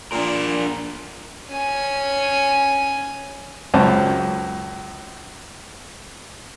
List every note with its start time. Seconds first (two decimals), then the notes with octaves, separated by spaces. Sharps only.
0.12 A#2 D4 A#4
1.48 C#4 G#5
3.74 C#2 F#2 C#4 C5 A5